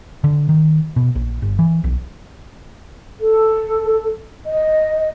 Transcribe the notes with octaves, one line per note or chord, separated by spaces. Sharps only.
D3
D#3
B2
A#1
G1
E3
B1
A4
D#5